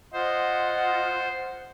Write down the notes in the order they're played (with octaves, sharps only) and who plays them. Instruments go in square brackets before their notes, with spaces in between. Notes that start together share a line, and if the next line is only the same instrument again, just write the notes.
[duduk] F4 [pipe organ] C5 [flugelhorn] D#5 [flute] F#5